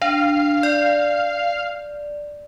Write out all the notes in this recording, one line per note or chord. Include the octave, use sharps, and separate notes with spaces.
D4 F5
D5